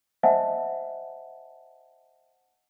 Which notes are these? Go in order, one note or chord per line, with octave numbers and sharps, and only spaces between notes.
C5 D#5 E5 F#5 G#5 A5